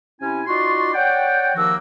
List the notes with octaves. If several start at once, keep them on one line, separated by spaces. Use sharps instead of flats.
C3 C#4 E4 G#5
D#4 F4 F#4 D5 C6 C#6
C#5 D5 F#5 G5
D#2 D#3 F3 A#3 F#4 E6